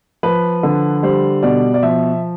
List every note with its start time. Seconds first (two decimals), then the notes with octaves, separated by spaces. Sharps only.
0.23 F3 B4
0.63 D3
1.03 G3 C5
1.43 B2 D5
1.74 D5
1.83 F3 E5